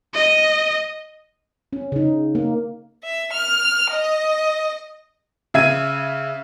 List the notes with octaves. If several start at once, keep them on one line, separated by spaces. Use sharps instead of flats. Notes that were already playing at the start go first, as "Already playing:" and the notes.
D#5
C#4
C#3 D#4
A#3
E5
F6
D#5
C#3 E5 G#6 D#7